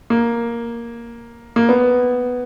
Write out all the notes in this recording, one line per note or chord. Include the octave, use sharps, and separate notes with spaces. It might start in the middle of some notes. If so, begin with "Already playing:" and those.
A#3
A#3
B3